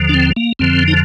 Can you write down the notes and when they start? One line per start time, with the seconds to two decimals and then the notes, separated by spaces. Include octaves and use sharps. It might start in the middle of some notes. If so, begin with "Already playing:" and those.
Already playing: D#2 D3 F3
0.09 D4
0.14 C4
0.36 A#3
0.59 F2 D3 F3 C4
0.88 D#4